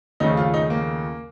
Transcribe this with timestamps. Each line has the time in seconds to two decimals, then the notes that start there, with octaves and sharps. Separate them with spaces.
0.20 D#2 C#3 F3 A3 D#4
0.37 F4
0.54 D#4
0.70 A#3